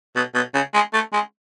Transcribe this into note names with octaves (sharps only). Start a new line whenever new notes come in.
B2
B2
C#3
G#3
A3
G#3